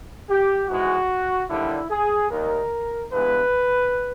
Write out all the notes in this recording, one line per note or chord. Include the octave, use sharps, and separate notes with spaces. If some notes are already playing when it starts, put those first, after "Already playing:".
G4
G#2 E3 G#3 F#4
D#2 D3 G3 E4
G#4
D#2 D#3 G3 A#4
G2 E3 G#3 B3 B4